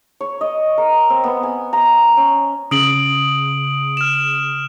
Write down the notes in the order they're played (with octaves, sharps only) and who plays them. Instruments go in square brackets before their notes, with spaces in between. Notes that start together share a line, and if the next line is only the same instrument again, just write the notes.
[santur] C#5
D#5
A#4
C4
B3
G#5
A#5
C#4
[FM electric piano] C#3 [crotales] D#6 D7 F#7
[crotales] F6 E7